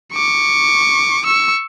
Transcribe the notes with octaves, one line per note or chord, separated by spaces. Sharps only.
C#6 D6
C#6 E6